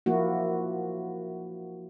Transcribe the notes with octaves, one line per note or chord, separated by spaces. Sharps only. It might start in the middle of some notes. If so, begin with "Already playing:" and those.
F3 A#3 E4 F#4